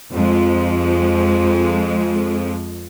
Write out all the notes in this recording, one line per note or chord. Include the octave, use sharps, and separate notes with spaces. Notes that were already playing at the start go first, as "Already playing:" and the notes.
F2 F3 G#3